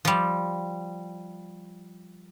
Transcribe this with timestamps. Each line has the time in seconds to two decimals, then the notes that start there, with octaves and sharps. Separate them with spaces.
0.05 F3 G3